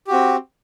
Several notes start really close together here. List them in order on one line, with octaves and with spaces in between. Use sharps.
G4 F#4 C4